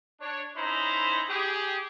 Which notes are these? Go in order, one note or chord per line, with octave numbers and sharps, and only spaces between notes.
D4 C#5
C#4 D#4 E4 C5 A#5 B5
G4 G#4